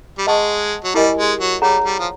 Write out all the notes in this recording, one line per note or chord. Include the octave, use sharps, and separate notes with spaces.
G3
G#3 B4 D#5 F#5 A5 C#6
F#3
G3 E4 G4 A#4 D#5 G#5
G#3
F#3
G3 G#4 C#5 F#5 A#5
G3
F3